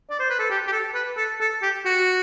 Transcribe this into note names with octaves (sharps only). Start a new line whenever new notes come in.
D5
C5
B4
A4
G4
G4
A4
B4
A4
A4
G4
F#4